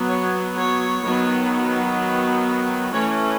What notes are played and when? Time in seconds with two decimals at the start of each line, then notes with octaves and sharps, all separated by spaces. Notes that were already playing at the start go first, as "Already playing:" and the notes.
Already playing: F#3 B3
0.08 C#5
0.56 C#5
1.04 D#3 F#3 B3
2.93 E3 A3 C#4 C#5